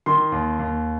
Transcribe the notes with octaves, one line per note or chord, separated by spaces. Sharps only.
D#3 C6
D#2
D#2